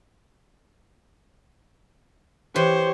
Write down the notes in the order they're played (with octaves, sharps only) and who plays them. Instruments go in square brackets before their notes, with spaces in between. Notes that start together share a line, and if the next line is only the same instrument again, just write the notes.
[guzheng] E3 [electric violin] G4 C#5 [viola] C5